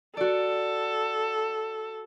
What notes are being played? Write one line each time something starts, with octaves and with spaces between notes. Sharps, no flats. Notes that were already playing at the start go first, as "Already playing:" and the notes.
F#4 A4 D5